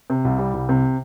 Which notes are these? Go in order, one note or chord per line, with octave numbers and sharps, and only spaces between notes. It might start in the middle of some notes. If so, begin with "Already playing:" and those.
C3
C2
G3
C2
C3